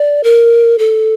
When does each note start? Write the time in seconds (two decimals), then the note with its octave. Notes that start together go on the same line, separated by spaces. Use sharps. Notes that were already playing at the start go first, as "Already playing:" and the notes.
Already playing: D5
0.24 A#4
0.79 A4